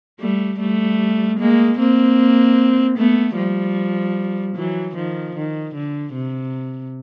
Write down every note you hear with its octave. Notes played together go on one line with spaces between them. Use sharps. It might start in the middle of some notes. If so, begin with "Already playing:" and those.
G3 A3
G3 A3
G#3 A#3
A#3 C4
A3 B3
F3 G3
E3 F#3
D#3 F3
D#3
D3
C3